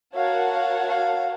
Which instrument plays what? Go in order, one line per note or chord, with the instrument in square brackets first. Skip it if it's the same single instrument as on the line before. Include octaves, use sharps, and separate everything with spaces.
[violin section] F#4 A#4 C#5 F#5 A5 [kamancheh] F5
[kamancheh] F5
F5